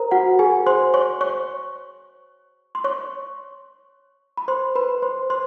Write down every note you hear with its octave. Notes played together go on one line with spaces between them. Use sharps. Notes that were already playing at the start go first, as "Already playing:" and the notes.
Already playing: A#4 C5 A#5
F#4 F#5
G#4 G#5
C5 C6
C#5 C#6
C#5 C#6
C6
C#5 C#6
B5
C5 C6
B4 B5
C5 C6
C5 C6